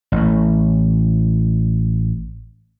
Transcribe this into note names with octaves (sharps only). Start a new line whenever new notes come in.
A1 A2